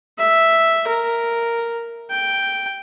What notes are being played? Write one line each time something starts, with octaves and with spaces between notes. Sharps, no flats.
E5
A#4
G5